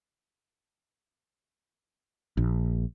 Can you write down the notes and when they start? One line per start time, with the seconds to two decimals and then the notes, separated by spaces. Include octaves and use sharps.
2.37 A#1